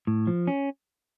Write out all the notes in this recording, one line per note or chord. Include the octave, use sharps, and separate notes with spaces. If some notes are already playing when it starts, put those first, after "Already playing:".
A2
F3
C#4